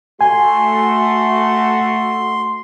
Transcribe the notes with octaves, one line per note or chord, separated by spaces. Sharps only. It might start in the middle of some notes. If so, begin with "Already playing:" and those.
A3 F#4 G#5 C6